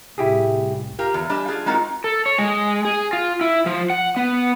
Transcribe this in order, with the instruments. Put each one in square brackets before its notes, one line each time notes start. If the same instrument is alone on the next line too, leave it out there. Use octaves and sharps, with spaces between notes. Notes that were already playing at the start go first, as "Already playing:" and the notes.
[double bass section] C2 A2 [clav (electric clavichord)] E4 G4 G#4
[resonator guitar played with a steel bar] F4 G4 A#4
E2
G3 D4 G4 D#5 G#5 A5
D4 F4 G#4
G#3 C4 D#4 F4 F#4 A#4
[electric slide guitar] A4
C#5
G#3
G#4
F4
E4
F3
F#5
B3